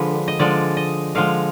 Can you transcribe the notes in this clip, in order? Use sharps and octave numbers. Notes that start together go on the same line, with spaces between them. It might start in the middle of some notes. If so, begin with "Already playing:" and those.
Already playing: D3 F3 G#3 B4
D#5
D3 F3 G#3 D5
D#5
D3 F3 G#3 F5